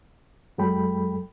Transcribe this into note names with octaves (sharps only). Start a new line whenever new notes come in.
F#2 F#3 G#3 A4 G5 B5